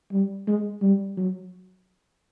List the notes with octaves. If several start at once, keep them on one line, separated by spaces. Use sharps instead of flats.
G3
G#3
G3
F#3